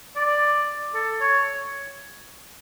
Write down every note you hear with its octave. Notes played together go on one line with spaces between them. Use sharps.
D5
A4
C#5